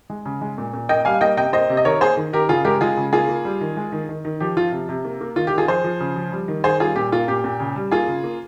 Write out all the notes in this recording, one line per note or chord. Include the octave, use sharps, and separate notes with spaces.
G#3
C#3
G#3
A#2
A#2
A#3 D#5 G5
G3 F5 G#5
A#3 D#5 G5
C3 D#5 G5
A#3 C5 D#5
C3
D#5
D#3 A#4 C#5
A#3 G#4 C5
D#3
D#3 G4 A#4
C#3 F4 G#4
G#3 G4 A#4
G#3 F4 G#4
C#3
A#3 F4 G#4
A#3
G3
D#3
G#3
D#3
D#3
D#3
F3 G4
F3 F4
C3
C3
A#3
A#3
D#3 F4
G4
D#3
F4 G#4
F3 G#4 C5
F3
C#3
F3
G3
D#3
D#3 G#4 C5
G3 F4 G#4
A#2 G4
A#3 F4
A#2 G4
A#2
C#3
G3
A#3 F4 G#4
C#3
A#3